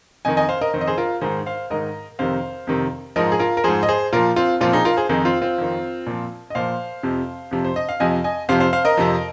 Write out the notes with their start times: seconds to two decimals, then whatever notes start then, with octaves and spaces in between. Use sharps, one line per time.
0.25 F2 D#3 D#5 G#5
0.37 D#5 G#5
0.49 C5 F5
0.61 A#4 D#5
0.74 D#3 C5
0.77 F2 D#5
0.87 G#4 C5
0.98 F4 A#4
1.21 G#2 D#3 G#4 C5
1.46 C5 F5
1.70 G#2 D#3 A#4 D#5
2.19 F2 C3 D#3 C5 F5
2.67 F2 C3 D#3
3.16 G#2 F3 A#4 D#5
3.32 G#4
3.39 F4 A#4
3.57 A#4
3.64 G#2 F3 G#4 C5
3.83 D#5
3.89 G#4 C5
4.13 A#2 F3 F4 A#4
4.36 C4 F4
4.61 A#2 F3 C4 F4
4.73 D#4 G#4
4.85 F4 A#4
4.97 G#4 C5
5.09 F2 D#3 D#4 G#4
5.25 C4 F4
5.42 C4 F4
5.58 F2 D#3
6.07 A#2 F3
6.50 D#5
6.55 A#2 F3 C5 F5
7.03 F2 C3 F3
7.51 F2 C3 F3
7.65 C5
7.76 D#5
7.89 F5
8.00 F2 C3 F3 D#5 G#5
8.24 D#5 G#5
8.49 F2 C3 F3 C5 F5
8.60 C5 F5
8.73 C5 F5
8.85 A#4 D#5
8.97 F2 C3 F3